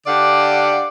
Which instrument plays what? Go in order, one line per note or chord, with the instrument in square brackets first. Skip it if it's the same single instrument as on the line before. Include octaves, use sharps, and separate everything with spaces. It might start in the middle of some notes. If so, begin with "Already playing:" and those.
[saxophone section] D3 G4 D5 F5 F#5